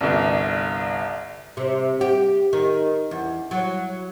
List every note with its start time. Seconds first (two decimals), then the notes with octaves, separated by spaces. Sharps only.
0.01 G1 C2
1.57 C3
2.01 G4
2.53 D#3
3.11 E2
3.51 F#3